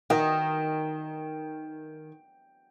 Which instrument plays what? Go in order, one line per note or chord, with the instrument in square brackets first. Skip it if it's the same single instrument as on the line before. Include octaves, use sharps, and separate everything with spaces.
[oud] D#3 [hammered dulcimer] G5